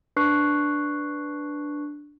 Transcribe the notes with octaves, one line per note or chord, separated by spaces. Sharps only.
D4 B4 C#6 F#6 C7